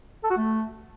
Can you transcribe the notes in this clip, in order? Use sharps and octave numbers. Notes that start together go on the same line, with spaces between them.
A4
F#4
A3